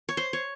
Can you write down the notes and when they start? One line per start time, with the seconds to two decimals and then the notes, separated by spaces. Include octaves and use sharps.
0.09 C#5
0.17 C5
0.33 C#5